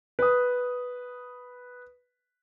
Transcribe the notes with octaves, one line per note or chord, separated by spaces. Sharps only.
B4 D#6